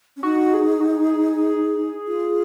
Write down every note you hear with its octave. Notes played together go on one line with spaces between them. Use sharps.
C#4
D#4 F#4
G#4
F#4
G#4
F4